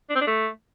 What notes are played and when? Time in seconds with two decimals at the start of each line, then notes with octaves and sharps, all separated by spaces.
0.10 D4
0.15 C4
0.21 D4
0.27 A3